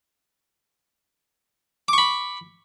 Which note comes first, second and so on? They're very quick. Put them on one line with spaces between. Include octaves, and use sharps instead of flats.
D6 C#6 B5